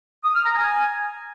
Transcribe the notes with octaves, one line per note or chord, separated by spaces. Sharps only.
D#6
F6
A#5
G#5